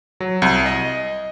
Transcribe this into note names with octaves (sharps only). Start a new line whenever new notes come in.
F#3
C2
D#5